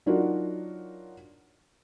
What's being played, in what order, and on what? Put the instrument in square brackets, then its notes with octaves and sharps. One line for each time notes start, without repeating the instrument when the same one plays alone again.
[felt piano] F#3 D4 D#4 F4 F#4 A#4